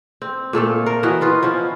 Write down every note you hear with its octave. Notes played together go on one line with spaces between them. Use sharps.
C4
A#2 A3 A4 F5
A#4
E3 F#4 D#5
B3 F4 B4
F3 C#4 E4